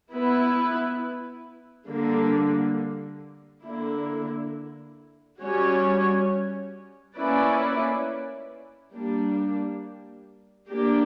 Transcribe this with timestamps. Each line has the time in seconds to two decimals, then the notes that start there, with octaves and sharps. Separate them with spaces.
0.13 B3 E4 B4
1.89 D3 G3 A#3
3.64 D3 A#3 E4
5.40 G3 C#4 F#4 C#5
7.17 A#3 C#4 E4 B4 D5
8.93 G3 A#3 D4
10.69 A#3 D4 G4